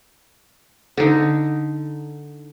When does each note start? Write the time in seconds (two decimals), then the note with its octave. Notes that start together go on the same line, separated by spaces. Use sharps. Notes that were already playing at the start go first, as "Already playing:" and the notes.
0.97 D3 D#4